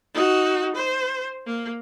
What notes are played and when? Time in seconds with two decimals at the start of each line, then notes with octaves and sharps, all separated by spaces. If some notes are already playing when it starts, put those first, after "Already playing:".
0.14 D#4 F#4
0.76 C5
1.46 A#3